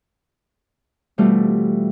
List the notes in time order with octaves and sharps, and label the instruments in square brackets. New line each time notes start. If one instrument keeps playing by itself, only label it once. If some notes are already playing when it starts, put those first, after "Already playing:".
[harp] B2 E3 G3 A3 C4 F4